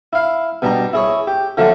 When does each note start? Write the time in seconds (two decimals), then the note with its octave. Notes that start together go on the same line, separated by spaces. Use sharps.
0.13 E4 F5
0.62 B2 G3 D4 A#5
0.93 E4 G#4 C#5
1.27 G4
1.57 D3 F3 F#3 A3 D4 F4